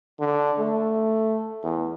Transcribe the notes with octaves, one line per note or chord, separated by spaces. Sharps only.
D3
A3
E2